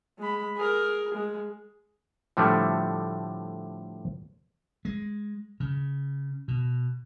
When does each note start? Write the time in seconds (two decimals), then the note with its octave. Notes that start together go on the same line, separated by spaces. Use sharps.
0.18 G#3 B5
0.56 G#4 A#4
1.14 G#3
2.37 A2 D3 F3 G3 A3
4.85 G#3
5.60 C#3
6.48 B2